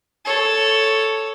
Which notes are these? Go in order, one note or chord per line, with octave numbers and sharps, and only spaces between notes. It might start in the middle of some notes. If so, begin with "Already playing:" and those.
A4 C#5